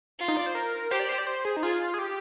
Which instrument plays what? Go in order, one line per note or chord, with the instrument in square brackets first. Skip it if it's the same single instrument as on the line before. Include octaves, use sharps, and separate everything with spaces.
[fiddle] F4
[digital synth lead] D#4
D5
C5
A#4
[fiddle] G4 [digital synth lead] C5
[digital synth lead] D5
C5
D5
C5
G#4
D#4
[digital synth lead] F4 [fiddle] G#4
[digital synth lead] G#4
G4